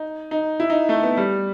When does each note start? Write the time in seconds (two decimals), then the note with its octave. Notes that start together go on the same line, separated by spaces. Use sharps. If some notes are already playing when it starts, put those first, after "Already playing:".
Already playing: D#4
0.31 D#4
0.60 E4
0.70 D#4
0.89 A3
1.03 B3
1.17 G3